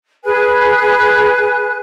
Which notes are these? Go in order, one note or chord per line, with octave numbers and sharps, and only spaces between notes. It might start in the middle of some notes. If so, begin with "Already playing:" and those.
G#4 B4 G#5 F#6